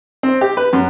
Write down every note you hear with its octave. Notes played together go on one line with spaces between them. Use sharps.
C4
G4
B4
F#2